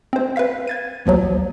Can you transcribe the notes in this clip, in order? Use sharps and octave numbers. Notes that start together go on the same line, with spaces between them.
C4 C5
B4 E5 F5 B6
G#6 A6 D#7
A1 D#2 F3 F#3